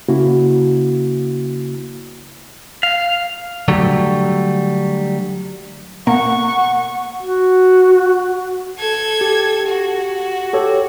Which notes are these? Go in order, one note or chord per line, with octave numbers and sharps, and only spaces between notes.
C#3 A#3 C#4 E4 F#4
F5
D3 F#3 G3 A3
B2 A#3 A#4 F#5 C#6
F#4
A4 G#6
G4
F#4
G4 A4 C#5